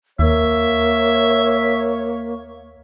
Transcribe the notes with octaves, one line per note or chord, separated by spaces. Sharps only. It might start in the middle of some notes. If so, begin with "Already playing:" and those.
D#2 A#3 C#5 E5